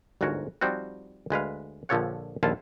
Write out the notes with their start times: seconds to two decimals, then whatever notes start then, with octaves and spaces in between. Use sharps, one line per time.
0.21 G1 D2 G#2 F#4 A#4 C#5
0.61 F3 G3 C4 D#4 F#4
1.30 D2 G#3 B4 F5
1.89 A#1 D3 F3 A4 C#5 F#5
2.43 A#1 D#2 E4 F4 A4 A5